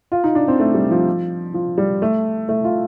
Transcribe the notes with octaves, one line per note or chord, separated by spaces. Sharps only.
F4
D#4
D4
C4
A3
G3
F3
F3
G3
A3
A3
F4